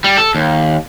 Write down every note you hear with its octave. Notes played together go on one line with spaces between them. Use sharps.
G3
A4
D#2